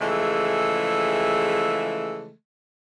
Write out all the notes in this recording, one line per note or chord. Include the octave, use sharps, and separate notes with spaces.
C#3 E3 F3 G#3 A3